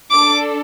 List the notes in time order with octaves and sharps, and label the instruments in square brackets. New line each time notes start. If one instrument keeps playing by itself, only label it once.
[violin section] D4 A4 D6